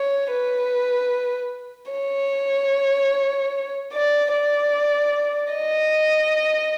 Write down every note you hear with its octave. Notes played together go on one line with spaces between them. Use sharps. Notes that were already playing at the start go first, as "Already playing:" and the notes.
Already playing: C#5
B4
C#5
D5
D5
D#5